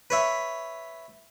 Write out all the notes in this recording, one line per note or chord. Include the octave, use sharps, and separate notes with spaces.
B4 C#5 E5